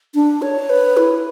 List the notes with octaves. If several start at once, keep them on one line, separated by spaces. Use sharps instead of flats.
D4
C#5
B4
E4